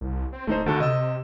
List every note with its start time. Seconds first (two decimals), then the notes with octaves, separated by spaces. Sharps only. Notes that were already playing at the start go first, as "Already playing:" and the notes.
0.01 C2
0.32 C4
0.47 D1 A3 D#4 C5
0.66 D2 D3 F#4 A4
0.80 C3 D#5 E6